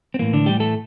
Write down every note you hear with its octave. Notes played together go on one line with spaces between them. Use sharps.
C4
A2 E3 A#3
D3 D4
G3 G4
A3 A4